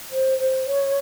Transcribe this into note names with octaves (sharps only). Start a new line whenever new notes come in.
C5
C5
C#5